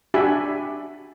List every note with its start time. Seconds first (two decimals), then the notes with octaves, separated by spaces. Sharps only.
0.14 D4 F#4 G4 E5 G#5 B5